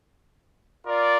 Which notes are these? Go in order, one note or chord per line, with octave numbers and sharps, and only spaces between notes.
F4 A#4 D5